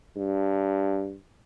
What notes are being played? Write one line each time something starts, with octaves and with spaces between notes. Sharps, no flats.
G2